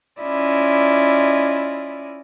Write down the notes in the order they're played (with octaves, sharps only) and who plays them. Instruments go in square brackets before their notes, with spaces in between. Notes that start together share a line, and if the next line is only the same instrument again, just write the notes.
[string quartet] C#4 E4 F4 D5 D#5